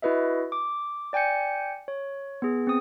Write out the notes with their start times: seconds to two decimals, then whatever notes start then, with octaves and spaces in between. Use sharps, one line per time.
0.02 E4 F#4 B4 D#5 E5
0.52 D6
1.13 D5 G5 G#5 G6 C#7
1.88 C#5
2.42 B3 G#4
2.67 C4 D#6